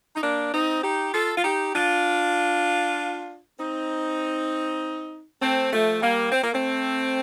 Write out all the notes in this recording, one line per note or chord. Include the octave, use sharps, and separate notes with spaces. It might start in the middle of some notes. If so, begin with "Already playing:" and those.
D#4
A#3 D4
C4 D#4
D#4 G4
F4 A4
F4
D#4 G4
D4 F4
C4 D#4
A3 C4
F3 A3
G3 A#3
C4
A#3
A3 C4